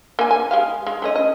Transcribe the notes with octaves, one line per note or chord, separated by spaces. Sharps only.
A#3 G#5
G#5
G#3 G4 F5
G#3
A3 C#4 D#5
D#5